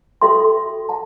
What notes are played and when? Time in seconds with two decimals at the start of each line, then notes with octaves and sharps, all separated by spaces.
0.22 F#4 A4 E5 G5 C6
0.89 F#5 A5